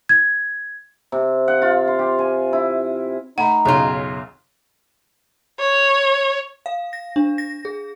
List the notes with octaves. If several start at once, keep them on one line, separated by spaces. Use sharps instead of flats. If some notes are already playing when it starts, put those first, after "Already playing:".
G#6
C3
F#5
F4
C6
G4
G#5
E4
A3 D#4 F#5 B5
B1 F#2 C#3 F#3 F4
C#5
F5
A#6
D4
A#6
G#4